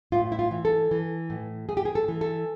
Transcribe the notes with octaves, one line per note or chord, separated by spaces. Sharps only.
A2 F4
E4
F4
E3
A4
E3
A2
A2 G#4
G4
G#4
A4
E3
A4